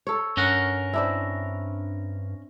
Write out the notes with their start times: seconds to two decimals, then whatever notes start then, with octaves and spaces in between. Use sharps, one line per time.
0.07 A4 C#5
0.37 G2 C#4 A#4 F#5
0.93 C4 D4 E4